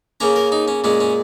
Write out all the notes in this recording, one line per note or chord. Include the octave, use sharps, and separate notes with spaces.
C#3 A#3 C#4 A#5
A#4
D#4
C#4
A#2 G#3 C#4
C#4